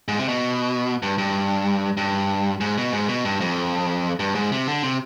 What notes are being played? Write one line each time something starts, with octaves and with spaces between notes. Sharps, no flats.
G#2
C3
B2
G2
G2
G2
G#2
B2
G#2
B2
G2
F2
G2
G#2
C3
D3
C3